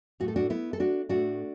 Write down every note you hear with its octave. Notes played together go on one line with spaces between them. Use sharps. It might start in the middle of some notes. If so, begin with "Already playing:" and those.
A2 A3 F#4 A4
D4 F#4
B3 E4
A4
D4 F#4
A2 A3 D4 F#4